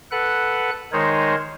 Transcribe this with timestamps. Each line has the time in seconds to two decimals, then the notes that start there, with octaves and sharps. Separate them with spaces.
0.11 A4 B4 F#5 F#6
0.92 D#3 G#3 D#4 A#4 C5 C#5